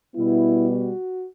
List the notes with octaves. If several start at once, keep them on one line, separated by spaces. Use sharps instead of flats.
B2 G3 B3 E4
F#4